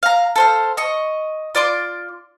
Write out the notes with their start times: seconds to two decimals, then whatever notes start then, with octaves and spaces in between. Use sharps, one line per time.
0.03 F5 A#5
0.36 A4 C5 F5
0.77 D#5 C#6
1.55 F4 D5 C6 D6